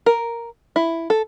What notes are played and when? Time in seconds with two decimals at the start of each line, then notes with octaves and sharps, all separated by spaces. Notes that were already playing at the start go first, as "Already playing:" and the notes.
0.06 A#4
0.76 E4
1.10 A4